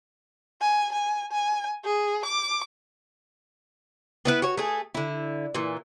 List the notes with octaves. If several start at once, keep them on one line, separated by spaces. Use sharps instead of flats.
G#5
G#5
G#5
G#4
D6
B3 E4 B4
F#4 C#5
A3 G#4
D3 E4
A#2 E3